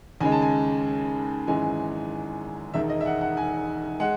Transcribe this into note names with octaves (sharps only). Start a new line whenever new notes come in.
D#2 C#3 G#3 G#5
A5
G#5
G#1 F#2 E3 G#3 G#5
E1 D#2 D#3 E5
D#5
E5
F#5
F#5
G#5
G#3 F#5